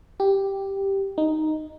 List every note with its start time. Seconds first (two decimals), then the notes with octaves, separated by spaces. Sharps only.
0.20 G4
1.18 D#4